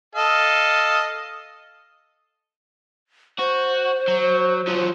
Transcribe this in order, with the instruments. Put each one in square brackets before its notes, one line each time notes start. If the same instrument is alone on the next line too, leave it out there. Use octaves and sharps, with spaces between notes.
[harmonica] A4 D#5 F5
[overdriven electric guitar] F#4 [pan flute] C5
[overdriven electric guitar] F#3
F3 F#3